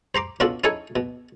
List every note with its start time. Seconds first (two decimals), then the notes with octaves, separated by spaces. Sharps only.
0.15 C5 A#5 C6 D6
0.40 B2 C#4 D4 F4 F#4 A4
0.64 C#4 D#4 E4 A4 C#5 G#5
0.96 B2